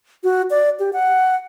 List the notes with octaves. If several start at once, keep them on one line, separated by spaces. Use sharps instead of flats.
F#4
D5
G4
F#5